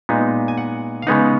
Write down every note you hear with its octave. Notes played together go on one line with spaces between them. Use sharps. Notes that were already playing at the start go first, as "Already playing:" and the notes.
A#2 G#3 B3 D#4
G#5
F#5
F5
C#3 G#3 B3 D#4 F#5